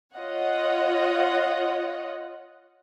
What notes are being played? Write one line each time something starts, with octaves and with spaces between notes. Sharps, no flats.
F4 C#5 D#5 F#5